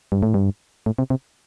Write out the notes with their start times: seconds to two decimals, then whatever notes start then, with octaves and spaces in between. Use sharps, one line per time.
0.12 G2
0.23 A2
0.34 G2
0.86 A2
0.98 C3
1.10 C3